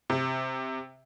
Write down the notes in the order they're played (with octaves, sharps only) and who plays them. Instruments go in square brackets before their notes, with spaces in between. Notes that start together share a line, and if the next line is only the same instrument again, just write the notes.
[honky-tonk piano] C3